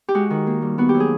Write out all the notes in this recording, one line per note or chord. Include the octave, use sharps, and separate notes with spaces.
G4
G#3 F#4
D#3
A#3
G3
B3 F#4
G4
F#3
G#4